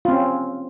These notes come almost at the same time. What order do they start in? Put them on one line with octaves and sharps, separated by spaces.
F4 C4 C#4